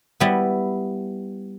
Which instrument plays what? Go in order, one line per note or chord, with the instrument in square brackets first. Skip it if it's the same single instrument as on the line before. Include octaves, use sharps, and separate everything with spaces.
[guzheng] G3 B3 E4